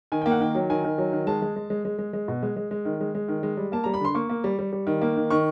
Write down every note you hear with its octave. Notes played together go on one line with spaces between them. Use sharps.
D#3 G#5
A#3 G5
F#5
D#3 G5
F#3
D#3 G#5
D#3
F#3
D#3
G#3 A5
G#3
G#3
G#3
G#3
G#3
G#3
B2
G#3
G#3
G#3
D#3
G#3
G#3
D#3
G#3
G3
A#3 A5
G3 A#5
B5
D3 C6
A#3 C#6
A#3
G3
G3
G3
D#3
A#3
D#3
D#3 C#6